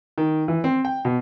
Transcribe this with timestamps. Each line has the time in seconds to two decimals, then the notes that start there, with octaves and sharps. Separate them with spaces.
0.18 D#3
0.48 E3
0.64 C4
0.85 G5
1.05 B2